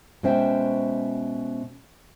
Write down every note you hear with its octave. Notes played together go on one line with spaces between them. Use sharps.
B2 G#3 C#4 C5 E5 G5